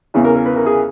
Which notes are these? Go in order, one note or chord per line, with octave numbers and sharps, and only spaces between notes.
E2 C#3 E3
A#4
A#4
B4
A#4
G#4